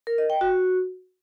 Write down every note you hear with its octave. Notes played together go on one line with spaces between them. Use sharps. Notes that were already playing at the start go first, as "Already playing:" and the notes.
A#4
D#5
G5
F#4